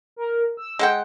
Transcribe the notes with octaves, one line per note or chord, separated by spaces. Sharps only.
A#4
E6
G#3 F#5 G5